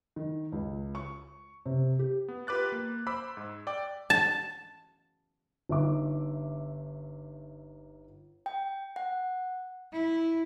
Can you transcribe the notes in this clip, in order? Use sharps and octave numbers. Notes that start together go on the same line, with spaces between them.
D#3
C#2
C#6
C3
G4
B3
F4 G4 B4 D6 F#6 A6
A#3
C5 B5 D6 E6 B6
G#2
D5 G5 D6
A5
G1 D#4 E5 D6
G5
F#5
E4